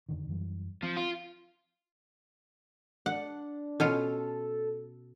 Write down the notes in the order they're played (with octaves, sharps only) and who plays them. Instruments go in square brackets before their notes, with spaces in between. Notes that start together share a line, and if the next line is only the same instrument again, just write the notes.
[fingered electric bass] F2 D3 D#3
F#2 E3 G3
[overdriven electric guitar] F3 [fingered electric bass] C4
[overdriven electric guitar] F4
[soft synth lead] D4 [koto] F#5
[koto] B2 C#4 F4 [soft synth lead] A4